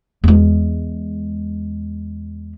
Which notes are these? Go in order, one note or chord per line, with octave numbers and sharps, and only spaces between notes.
E2 G#3